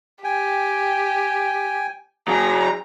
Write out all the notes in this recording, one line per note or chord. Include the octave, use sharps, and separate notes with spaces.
G4 G5 G#5
F#3 G#4 A#5